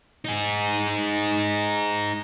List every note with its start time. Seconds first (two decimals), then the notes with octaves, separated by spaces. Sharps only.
0.25 D#4 G#4